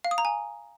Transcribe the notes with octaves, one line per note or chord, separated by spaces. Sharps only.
F5
D#6
A#5
G#5